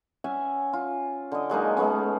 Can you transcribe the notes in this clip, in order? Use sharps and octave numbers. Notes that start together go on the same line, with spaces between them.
C#4 E5 F#5 G#5
F4
D3 D#5
F#3 G#3 A#3 D#4
G#3 A3 B3 C#4